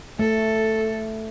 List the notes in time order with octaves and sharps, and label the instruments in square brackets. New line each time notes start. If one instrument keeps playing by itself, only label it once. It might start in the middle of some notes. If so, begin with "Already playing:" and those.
[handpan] A3 [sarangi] A4